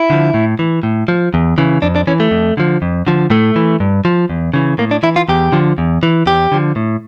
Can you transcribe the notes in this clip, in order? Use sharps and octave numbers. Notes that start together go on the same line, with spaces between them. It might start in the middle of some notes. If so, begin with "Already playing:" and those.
Already playing: E4
D3 F3
A2
E3
A2
F3
E2
C#3 E3
F2 D4
D4
E3 C#4
A3
F2
D3 F3
F2
D3 F3
A2 A3
E3
G2
F3
E2
C#3 E3
A2 A#3
D4
E3 E4
F4
E2 G4
D3 F3
E2
E3
E2 G4
D3 F3
A2